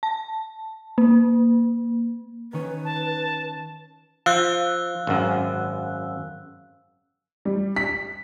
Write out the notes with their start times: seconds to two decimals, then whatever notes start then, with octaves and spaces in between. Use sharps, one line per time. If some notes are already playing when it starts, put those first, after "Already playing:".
0.03 A5
0.98 A#3
2.53 D#3 C#4 B4
2.85 A5
4.26 F3 F5 E6 F#6
5.07 G#1 F#2
7.45 G3
7.76 B6